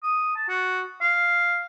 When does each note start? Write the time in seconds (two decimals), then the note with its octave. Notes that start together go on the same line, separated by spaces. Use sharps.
0.03 D#6
0.36 A5
0.49 F#4
1.01 F5